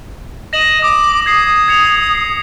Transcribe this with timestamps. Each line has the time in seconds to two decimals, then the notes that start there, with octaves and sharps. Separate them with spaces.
0.53 D#5 A#6 E7 F#7
0.82 D6 D#6
1.26 D#6 G#6 C7
1.68 G#6 C#7 F7
2.15 C7